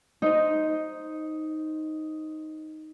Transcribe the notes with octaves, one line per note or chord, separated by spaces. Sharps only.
D#4 C5 D#5